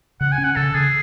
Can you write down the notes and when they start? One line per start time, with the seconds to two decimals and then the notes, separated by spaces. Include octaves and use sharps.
0.21 C#3 F#5
0.32 G#5
0.38 C#4
0.44 F#5
0.56 C#3 A4
0.75 C#3 G#4